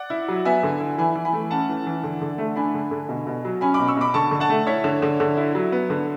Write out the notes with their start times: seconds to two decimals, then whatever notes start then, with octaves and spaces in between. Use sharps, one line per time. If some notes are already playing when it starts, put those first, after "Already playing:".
Already playing: D5 F#5
0.10 E4
0.28 F#3
0.45 B3 E5 G#5
0.63 D3
0.80 E4
0.98 E3 G#5 B5
1.15 E3
1.25 G#5 B5
1.33 A3
1.50 C#4 F#5 A5
1.69 E3
1.86 E3
2.04 D3
2.22 D3
2.38 A3
2.56 D4 G#5 B5
2.74 D3
2.91 D3
3.09 B2
3.27 B2
3.45 F#3
3.61 C#4 G#5 B5
3.74 B5 D6
3.80 B2
3.88 C#6 E6
3.97 B2 B5 D6
4.14 D3 A5 C#6
4.31 D3
4.40 F#5 A5
4.49 A3
4.67 E4 C#5 E5
4.84 D3
5.02 D3
5.20 D3
5.37 E4
5.55 F#3
5.72 B3
5.90 D3